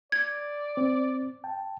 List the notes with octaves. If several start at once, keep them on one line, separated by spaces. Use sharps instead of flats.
D5 G#6
C4
G5 A5